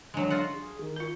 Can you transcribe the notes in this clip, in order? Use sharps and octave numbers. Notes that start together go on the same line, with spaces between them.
D3 F#3 G#3
F4 F#4 F#5
G#4
D#3
F4 A#4